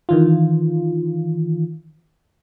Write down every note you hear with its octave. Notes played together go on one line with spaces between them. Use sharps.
D#3 E3 F4